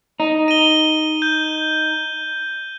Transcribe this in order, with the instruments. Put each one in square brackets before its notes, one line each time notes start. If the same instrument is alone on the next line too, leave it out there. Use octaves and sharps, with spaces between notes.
[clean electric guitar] D#4
[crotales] D#7 G7
G6